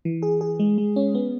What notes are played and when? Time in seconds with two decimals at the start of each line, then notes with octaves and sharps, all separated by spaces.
0.05 E3
0.23 G#4
0.41 G#4
0.59 G#3
0.78 G#3
0.96 C#4
1.15 B3